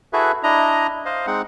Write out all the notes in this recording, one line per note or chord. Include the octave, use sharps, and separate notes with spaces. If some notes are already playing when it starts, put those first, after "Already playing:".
E4 F#4 G#4 A4 B4 E5
D4 E4 D#5 A#5
C5 D#5 F5
G#3 C4 D#4 F#5